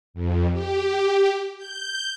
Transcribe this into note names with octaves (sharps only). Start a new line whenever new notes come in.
F2
G4
G6